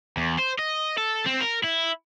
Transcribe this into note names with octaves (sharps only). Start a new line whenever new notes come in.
E2
C5
D#5
A4
C4
A#4
E4